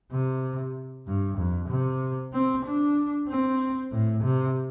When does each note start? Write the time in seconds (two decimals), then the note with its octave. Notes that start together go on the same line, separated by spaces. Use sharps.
0.12 C3
1.06 G2
1.38 F2
1.69 C3
2.33 C4
2.65 D4
3.28 C4
3.92 A2
4.23 C3